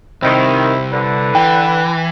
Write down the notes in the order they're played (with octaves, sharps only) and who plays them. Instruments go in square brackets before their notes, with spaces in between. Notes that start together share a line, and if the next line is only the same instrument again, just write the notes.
[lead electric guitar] C2 [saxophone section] D#3 [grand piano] C4 [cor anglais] E4
[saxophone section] D3 [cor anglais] B4
[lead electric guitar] E3 [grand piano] G5